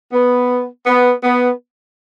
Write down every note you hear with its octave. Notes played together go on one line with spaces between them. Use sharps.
B3
B3
B3